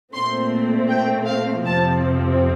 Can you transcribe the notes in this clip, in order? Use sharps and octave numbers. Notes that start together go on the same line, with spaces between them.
A#2 A3 C4 C6
G5
F5
F2 C3 F3 C4 A5